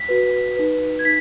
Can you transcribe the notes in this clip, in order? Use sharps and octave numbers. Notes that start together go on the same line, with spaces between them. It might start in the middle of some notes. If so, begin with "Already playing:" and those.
Already playing: B6
F#4 B4
D#4 B4
G#6
D#4 B6